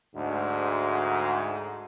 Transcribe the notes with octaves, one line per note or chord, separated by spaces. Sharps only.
D2 G#2